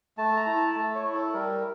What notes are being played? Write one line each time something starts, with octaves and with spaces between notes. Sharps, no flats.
A3 A5
A#5
E4
A5
A3
C#5
E4
A4
G3 A#4